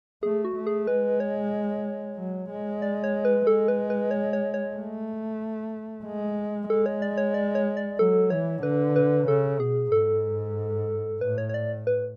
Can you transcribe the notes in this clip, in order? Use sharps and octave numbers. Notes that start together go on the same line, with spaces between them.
A3 G#4
F#4
A3
G#4
G#3 B4
C#5
F#3
G#3
D5
C#5
B4
G#3 A4
B4
B4
C#5
C#5
C#5
A3
G#3
G#3 A4
C#5
D5
C#5
D5
C#5
D5
F#3 A4
E3 C#5
D3 B4
B4
C#3 A4
B2 G#4
G#2 A4
A2 B4
C#5
C#5
D5
B4